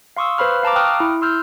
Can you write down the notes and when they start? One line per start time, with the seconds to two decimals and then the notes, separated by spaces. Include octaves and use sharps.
0.17 F5 C6 C#6 D#6 E6
0.38 B4 C5 F5 B5 F6
0.63 F5 A5 A#5 D6
0.76 G5 C#6 D#6 F6 F#6
1.00 E4
1.21 C6 E6 F6 G6